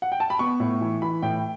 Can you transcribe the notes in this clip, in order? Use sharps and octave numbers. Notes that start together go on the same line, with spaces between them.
F#5
G5
A5
B5
B3 C#6
A2
E3
E3 B5
A2 G5